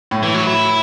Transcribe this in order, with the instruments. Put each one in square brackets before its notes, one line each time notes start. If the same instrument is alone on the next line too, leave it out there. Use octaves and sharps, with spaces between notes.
[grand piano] A2
[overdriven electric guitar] E3
F#3
E4